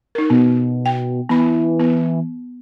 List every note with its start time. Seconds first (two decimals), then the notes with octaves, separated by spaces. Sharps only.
0.15 D#4 A#4
0.30 B2 B3
0.86 G5
1.29 E3 B3 B5
1.80 B3